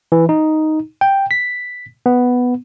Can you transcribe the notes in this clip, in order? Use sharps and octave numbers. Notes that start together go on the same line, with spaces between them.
E3
D#4
G5
B6
B3